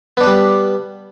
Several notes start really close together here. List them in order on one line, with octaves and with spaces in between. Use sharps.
B3 D4 B4 G3